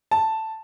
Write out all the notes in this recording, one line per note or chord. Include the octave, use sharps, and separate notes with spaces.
A5